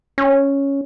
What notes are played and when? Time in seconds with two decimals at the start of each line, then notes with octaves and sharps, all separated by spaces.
0.18 C#4